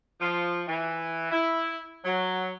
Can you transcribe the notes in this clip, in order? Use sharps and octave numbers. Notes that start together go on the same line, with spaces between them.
F3
E3
E4
F#3